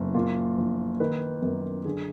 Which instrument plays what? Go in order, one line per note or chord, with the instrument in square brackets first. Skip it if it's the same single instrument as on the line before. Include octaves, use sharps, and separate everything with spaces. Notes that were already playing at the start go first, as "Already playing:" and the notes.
Already playing: [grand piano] F#1
A#2 F4
A#1
D#3 B4
F#2 A#4
D3 G#4